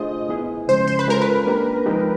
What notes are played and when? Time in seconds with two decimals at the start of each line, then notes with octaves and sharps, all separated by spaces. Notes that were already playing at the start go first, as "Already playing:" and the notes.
Already playing: A3 D4 F4 G#4 C5 D#5
0.29 B3 E4 G#4
0.68 C#3 F3 G#3 C#4 C5
0.87 C5
0.99 B4
1.08 G#3 C#4 F4 A4 A#4
1.22 B4
1.46 A#3 D4 G4
1.86 F3 G#3 C4 D#4 G4